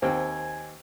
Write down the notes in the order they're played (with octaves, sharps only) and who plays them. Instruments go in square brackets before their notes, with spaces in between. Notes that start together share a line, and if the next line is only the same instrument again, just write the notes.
[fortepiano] D#2 C4 G5 [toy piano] C5 [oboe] G#5